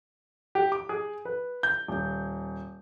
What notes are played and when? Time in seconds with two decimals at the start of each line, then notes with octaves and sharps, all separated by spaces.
0.55 G4
0.72 D6
0.89 G#4
1.25 B4
1.63 G6
1.88 D#1